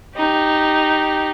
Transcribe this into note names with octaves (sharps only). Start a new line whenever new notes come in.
D#4 G4